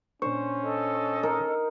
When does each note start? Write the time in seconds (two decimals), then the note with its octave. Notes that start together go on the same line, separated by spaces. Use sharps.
0.22 A#2 C#4 D4 C5 C#6
0.62 A4 D#5
1.23 D#4 A#4